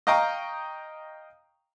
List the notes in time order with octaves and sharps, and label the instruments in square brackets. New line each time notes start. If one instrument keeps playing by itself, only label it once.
[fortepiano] D#5 F5 G5 A#5 C#6 D#6